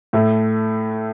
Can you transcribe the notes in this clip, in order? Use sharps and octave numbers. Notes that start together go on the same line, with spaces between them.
A2 A3